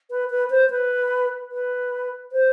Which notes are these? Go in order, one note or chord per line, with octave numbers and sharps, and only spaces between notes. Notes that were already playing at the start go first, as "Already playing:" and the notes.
B4
B4
C5
B4
B4
C5